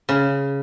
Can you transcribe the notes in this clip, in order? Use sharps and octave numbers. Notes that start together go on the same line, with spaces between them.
C#3